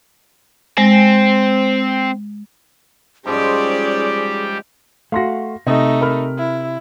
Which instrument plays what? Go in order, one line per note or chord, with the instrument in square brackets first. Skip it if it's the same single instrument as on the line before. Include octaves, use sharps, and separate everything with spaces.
[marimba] G#3 G#5 A#6 [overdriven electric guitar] C4
[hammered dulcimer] G#2 F3 G#3 [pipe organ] G3 G4 [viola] C#4 D5 [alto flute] G#4
[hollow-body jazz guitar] A3 F#4 [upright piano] F5 C6 A#6
[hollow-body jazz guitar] C3 [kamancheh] A3 D#4 [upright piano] D#5
[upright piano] A#4 B5 F6
[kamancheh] E4